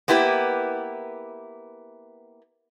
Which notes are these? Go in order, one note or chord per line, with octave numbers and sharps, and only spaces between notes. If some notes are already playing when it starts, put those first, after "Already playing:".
A#3 B3 E4 G4 B4